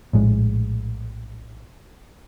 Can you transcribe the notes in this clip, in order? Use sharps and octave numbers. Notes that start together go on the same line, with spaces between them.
A#1 A2 G#3